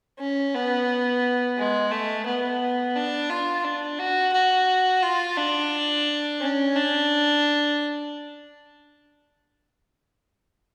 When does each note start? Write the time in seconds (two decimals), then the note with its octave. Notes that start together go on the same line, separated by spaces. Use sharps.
0.19 C#4
0.54 B3
1.58 G#3
1.92 A3
2.26 B3
2.96 D4
3.30 F4
3.64 D4
3.99 F#4
4.33 F#4
5.03 F4
5.37 D4
6.41 C#4
6.75 D4